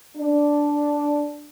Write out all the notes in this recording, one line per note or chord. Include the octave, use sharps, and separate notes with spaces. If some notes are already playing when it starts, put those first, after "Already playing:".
D4